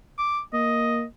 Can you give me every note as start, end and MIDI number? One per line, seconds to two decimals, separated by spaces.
0.18 0.40 86
0.53 1.04 58
0.53 1.02 75